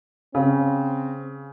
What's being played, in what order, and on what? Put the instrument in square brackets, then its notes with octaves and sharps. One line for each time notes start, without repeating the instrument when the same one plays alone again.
[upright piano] C#3 [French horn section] C4